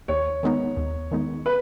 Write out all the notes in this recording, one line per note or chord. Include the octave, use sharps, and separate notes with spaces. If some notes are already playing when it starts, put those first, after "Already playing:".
D#2 C#5
D#3 G#3 B3 D#4
D#2
D#3 G#3 B3 D#4
B4